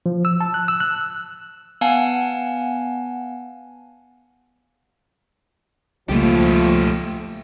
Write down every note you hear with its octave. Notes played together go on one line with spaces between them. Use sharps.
F3
E6
A5
F#6
E6
F#6
B3 F5 F#5 G#5 A5
C#2 F3 G3 A3 A#3 G4